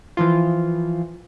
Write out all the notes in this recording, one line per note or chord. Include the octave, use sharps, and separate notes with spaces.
E3 F3 F4